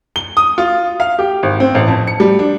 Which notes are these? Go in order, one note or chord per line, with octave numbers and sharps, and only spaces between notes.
G7
D#6
F4
F5
G4
G#1
C4
A1
F2
C#7
G3
D4